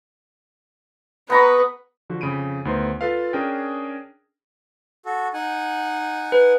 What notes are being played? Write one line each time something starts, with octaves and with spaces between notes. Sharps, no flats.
B3 B4 A#5 C#6
D3 F3 F#4
F2 C#3 B5 D7 D#7
D2 D#3 B3 C5 A#5 C6
F4 A4 B4 F5
C#4 D4 G#4 A#4 G5
F#4 A4
D#4 F#5 G#5
B4